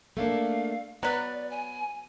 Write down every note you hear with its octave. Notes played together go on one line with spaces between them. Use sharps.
A3 A#3 D4 F5
F#3 B3 B4 D5
G#5